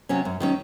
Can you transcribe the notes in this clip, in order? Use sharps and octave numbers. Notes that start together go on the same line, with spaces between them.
C3 F#3 C#4
F#2
D#3 F#3 C#4